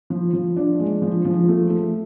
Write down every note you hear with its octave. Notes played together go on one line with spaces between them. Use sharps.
F3
F3
D4
G#3
F3
F3
A3
A3